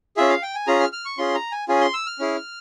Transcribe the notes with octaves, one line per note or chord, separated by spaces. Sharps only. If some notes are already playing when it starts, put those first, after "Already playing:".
C#4 F4 G#4 E5
F5
G5
G#5
C#4 F4 G#4 A#5
F6
F6
C#6
C#4 F4 G#4 C6
A#5
G#5
C#4 F4 G#4 G#5
C6
E6
F6
C#4 E4 G#4